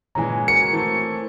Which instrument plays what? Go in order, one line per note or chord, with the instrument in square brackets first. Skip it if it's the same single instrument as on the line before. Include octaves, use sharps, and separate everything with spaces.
[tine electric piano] G1 A#2 [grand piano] E3 G#3 C#4 [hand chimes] G#5 A#5
[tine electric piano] F#4 [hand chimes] A#4 [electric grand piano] C#7
[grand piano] E3 A3 C4